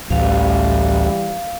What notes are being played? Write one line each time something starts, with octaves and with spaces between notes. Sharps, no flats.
A1 D2 E3 G3 F5